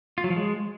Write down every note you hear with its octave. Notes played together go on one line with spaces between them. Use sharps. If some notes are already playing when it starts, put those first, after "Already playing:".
F4
F#3
F3
G#3